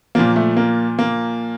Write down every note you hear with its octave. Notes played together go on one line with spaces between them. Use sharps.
A#2 F3 A#3
A3
A#3
A#3